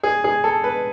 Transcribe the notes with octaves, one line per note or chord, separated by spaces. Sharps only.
G#4
G#4
A4
B4